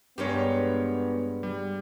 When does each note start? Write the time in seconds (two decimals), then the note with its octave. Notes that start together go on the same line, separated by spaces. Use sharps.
0.18 G2 G3 G#3 B3 G4 A#4 C#5
1.43 G3